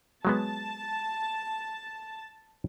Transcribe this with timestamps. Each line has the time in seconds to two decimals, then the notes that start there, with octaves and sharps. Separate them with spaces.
0.25 F#3 G#3 B3 A5